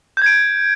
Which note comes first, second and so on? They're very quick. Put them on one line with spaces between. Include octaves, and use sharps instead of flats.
G6 G#6 D7